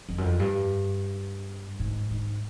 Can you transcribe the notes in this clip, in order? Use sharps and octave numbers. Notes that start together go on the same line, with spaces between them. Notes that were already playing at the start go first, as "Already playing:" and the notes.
F2
F#2
F2
G2
G#2
G#2